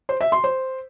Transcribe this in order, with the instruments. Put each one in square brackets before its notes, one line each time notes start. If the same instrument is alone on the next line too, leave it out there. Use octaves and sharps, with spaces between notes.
[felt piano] C5
E5
C6
C5